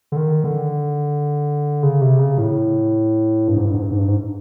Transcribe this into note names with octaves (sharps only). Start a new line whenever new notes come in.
D3
D#3
D3
C#3
C3
C#3
A2
G2
G#2
G2
G#2
G2
G#2
G2
G#2